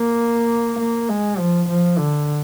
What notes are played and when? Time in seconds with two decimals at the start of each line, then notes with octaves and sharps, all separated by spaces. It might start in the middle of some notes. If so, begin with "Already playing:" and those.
Already playing: A#3
0.79 A#3
1.09 G#3
1.38 F3
1.68 F3
1.98 D3